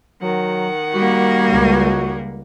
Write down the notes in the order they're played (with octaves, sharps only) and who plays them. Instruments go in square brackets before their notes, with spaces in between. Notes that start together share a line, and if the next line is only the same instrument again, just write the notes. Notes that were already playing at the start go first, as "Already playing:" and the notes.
[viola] D#3 F#5 [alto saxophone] F#3
[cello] G3 A#3 [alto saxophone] F#4
[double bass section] C#2